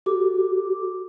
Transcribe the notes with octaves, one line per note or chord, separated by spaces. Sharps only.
F#4 G4 A4 D6